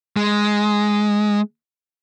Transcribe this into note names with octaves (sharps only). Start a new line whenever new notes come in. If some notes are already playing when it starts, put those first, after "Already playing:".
G#3